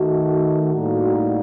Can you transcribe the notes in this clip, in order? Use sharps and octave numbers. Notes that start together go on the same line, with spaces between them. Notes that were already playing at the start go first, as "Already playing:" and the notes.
Already playing: D#3 A3 D#4 F#4
A2 G3 A#3 D#4 F#4